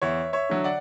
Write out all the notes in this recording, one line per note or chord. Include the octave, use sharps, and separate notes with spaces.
E2 C#5 E5
C#5 E5
D3 F#3
D5 F#5